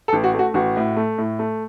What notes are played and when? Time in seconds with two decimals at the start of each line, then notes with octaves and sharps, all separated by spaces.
0.08 A4
0.13 A1
0.24 F#4
0.34 A3 F#4
0.54 A1 F#4
0.76 A2
0.97 A3
1.18 A2
1.39 A3